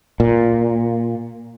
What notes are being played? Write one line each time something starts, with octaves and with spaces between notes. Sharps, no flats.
A#2